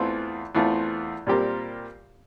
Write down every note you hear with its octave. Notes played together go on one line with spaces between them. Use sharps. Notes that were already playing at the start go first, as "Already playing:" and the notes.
Already playing: E2 E3 A3 C4 F4
E2 E3 A3 C4 F4
A#2 G3 C4 G4 A#4